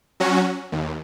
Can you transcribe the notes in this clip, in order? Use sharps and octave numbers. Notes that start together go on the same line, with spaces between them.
F#3 C#4 F#4
D#2